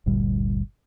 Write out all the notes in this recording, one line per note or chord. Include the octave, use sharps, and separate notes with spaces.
G1 D2 A#2 G3